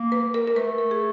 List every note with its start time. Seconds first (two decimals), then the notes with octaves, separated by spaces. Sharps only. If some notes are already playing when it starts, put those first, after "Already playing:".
Already playing: A#3
0.12 B4
0.34 A#4
0.47 A#4
0.56 A3 B4
0.78 A#4
0.91 G#4